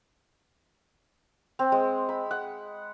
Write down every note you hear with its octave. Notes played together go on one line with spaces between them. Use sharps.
C4
G#3
B5
F#5